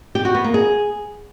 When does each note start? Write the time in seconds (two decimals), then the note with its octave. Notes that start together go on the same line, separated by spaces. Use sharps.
0.15 G4
0.25 F#4
0.35 B3
0.44 A#3
0.54 G#4